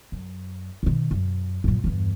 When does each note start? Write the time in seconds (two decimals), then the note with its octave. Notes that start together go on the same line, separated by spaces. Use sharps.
0.12 F#2
0.83 B2 D#3
1.11 F#2
1.64 F#2 A#2
1.84 E2 G2